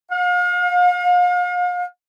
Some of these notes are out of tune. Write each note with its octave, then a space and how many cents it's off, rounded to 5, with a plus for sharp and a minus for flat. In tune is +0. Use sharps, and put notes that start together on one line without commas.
F5 +40